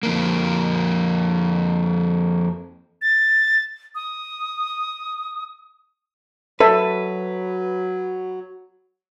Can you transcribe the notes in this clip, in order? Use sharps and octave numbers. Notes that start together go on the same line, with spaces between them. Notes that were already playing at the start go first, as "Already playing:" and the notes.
F2 A#3
A6
D#6
F#3 A4 B4 E5